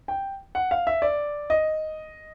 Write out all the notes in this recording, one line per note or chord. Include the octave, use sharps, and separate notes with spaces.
G5
F#5
F5
E5
D5
D#5